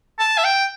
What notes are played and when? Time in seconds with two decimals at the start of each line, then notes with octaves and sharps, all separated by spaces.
0.19 A5
0.38 E5
0.44 G5